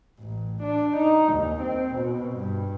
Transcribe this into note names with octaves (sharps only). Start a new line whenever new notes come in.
A1
D4
D#4
D#2
C4
B2
G2